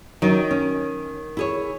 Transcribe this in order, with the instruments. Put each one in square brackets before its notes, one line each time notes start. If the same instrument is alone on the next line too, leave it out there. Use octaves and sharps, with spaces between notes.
[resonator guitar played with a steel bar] D#3 [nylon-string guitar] F#3
[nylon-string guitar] C#4
E4 G#4 C#5